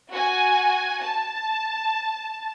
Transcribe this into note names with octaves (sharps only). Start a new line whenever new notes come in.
F#4 G#5
A5